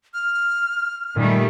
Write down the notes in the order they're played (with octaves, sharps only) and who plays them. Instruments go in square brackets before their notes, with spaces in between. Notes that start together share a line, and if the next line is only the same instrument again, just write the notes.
[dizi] F6
[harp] A#2 [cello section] D#3 G3 A3